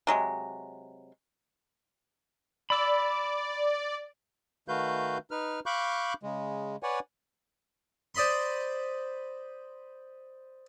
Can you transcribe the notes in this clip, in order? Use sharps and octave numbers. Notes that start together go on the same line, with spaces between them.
C3 F#3 G#3
D5 B5 E6
D#3 A3 F#4 B4 F5 G6
D#4 B4 F6
F5 B5 C#6 D6 F#6 G6
C#3 G#3
B4 C#5 D5 F#5 G#5
C5 D5 D#5 B5 C6